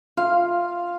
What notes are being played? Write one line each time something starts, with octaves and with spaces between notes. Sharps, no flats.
F4 F5